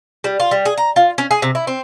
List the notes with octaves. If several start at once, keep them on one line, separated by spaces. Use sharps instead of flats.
G3
F4
G3
G#4
A#5
F4
C#4
G#4
C3
E4
C4